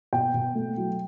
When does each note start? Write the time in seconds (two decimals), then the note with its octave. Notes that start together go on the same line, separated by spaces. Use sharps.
0.13 B2 G5
0.34 B2
0.55 A3
0.77 F#3